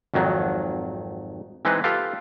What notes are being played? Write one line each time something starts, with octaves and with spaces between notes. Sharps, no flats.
G#1 F2 D#3 F#3
E3 G#3 C4 D#4 G#4 B4
F4 G4 A4 B4 F5